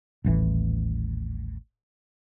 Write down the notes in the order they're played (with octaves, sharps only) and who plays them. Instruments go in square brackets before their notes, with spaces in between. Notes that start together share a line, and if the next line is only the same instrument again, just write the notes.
[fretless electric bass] D#1 A1 E3